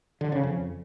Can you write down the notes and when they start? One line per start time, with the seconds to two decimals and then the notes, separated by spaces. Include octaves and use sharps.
0.21 D3
0.32 C#3
0.43 F2